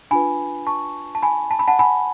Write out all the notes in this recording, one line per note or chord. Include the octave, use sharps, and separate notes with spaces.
D4 F4 B4 G#5 B5
A5 C#6
A5
G#5 B5
A5
B5
F#5 A5
G#5 B5